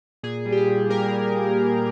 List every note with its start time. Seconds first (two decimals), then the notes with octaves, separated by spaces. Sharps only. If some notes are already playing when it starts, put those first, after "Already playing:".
0.23 A#2 G#4
0.46 G3
0.52 G4
0.57 G#4
0.68 A#2
0.89 A#3 A#4